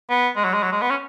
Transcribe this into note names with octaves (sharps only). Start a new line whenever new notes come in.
B3
G#3
F#3
G#3
F#3
G#3
B3
C#4